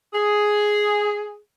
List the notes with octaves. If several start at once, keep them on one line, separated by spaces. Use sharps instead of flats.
G#4